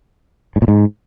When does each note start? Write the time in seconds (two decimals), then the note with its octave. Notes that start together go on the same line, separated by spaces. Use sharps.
0.56 G#2
0.62 A#2
0.68 G#2